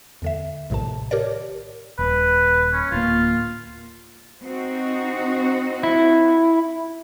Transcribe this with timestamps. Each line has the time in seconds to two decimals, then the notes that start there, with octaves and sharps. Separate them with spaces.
0.22 E2 D3 E5
0.70 A#1 A2 C3 D#3 A5
1.11 G4 A#4 C#5 D5
1.99 D#1 B4
2.73 C#4
2.92 D1 A#3 F4
4.41 C4 D#4 F#4
5.83 E4